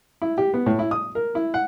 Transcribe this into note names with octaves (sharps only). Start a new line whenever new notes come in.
E4
G4
B3
A2
E4
D#6
A#4
E4
F#5